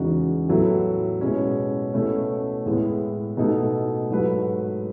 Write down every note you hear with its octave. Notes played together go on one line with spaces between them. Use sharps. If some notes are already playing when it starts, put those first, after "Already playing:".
Already playing: E2 C#3 G#3 D#4 F#4
A2 F#3 B3 E4 A4
B2 G#3 C#4 E4
B2 A3 C#4 E4
A2 G#3 B3 E4
B2 A3 D#4 A4
G#2 F#3 A3 E4 B4